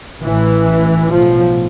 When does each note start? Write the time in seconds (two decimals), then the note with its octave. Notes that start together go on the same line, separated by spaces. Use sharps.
0.22 A1 A2 E3
1.11 B1 A2 F3